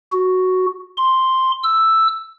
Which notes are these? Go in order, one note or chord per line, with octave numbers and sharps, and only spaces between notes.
F#4
C6
E6